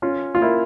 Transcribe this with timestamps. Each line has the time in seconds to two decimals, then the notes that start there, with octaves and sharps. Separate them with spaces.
0.02 C#4 F4
0.35 F4
0.42 A#3 E4